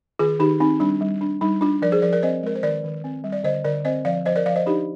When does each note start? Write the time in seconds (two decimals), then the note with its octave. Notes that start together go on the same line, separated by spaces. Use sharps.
0.19 D#3 F4 G#4
0.40 D#3 D#4 G4
0.60 C4 D#4
0.80 G3 D4
1.01 G3
1.21 D4
1.41 G3 D#4
1.61 D4 F4
1.82 F3 A#4 D5
1.92 G#4 C5
2.02 F3 A#4 D5
2.13 A#4 D5
2.23 C4 C5 D#5
2.43 G#3 A#4
2.55 C5
2.63 D#3 A#4 D5
2.84 D#3
3.04 C4
3.24 G3
3.32 D5
3.44 D3 C5 D#5
3.64 D3 A#4 D5
3.85 C4 C5 D#5
4.05 F3 D5 F5
4.26 F3 C5 D#5
4.36 A#4 D5
4.46 F3 D5 F5
4.56 C5 D#5
4.66 D4 D#4 G4